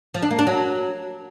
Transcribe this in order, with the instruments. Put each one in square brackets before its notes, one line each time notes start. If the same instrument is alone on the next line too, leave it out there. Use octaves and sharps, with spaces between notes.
[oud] F3
D4
A#3
D4
F#3